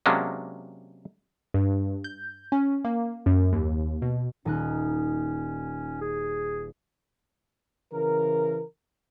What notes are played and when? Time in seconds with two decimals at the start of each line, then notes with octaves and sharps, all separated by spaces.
0.06 C3 F#3 G#3 A#3 C#4 D4
1.54 G2
2.04 G6
2.52 C#4
2.84 A#3
3.26 F#2
3.52 D#2
4.02 B2
4.45 D#1 C#4 D#4 F#6
6.01 G#4
7.92 C#3 E3 A#4